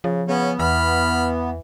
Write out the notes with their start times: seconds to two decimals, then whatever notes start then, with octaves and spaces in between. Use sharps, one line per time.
0.04 C#3 F3
0.28 C#3 B3 C#4
0.59 E2 E3 B5 F6